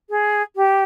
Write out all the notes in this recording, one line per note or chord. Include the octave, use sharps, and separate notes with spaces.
G#4
G4